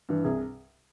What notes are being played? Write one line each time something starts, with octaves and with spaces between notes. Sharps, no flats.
G2 E3
C2 G#4